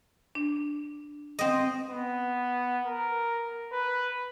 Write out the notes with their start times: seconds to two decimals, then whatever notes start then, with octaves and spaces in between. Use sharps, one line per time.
0.35 D4
1.39 C4 D#5
1.90 B3
2.85 A#4
3.73 B4